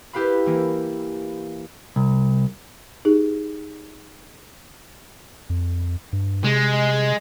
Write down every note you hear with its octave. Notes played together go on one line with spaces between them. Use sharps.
E4 G4 B4 F5 B5
E3 A#3
C2
D#4 G4 G#4
F2
G2
C3 G#3